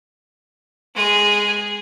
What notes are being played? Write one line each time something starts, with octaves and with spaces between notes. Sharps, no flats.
G#3 G#4